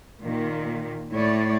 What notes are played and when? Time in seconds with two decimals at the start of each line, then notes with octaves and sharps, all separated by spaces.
0.21 A#2 D#3
1.13 A2 C#5 D5